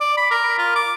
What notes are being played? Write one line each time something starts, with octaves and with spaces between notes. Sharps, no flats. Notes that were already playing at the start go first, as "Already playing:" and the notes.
D5
B5
A#4
F4
D6